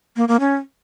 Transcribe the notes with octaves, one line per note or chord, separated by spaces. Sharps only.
A#3
A#3
C#4